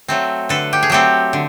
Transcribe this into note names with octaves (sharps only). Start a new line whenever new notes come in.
F#3 A3 C4
D3 A4 B4
G4
G#4
F#3 A3 C4 G4 A4
D3